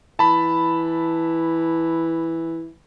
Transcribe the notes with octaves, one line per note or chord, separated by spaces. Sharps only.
E3 A5 B5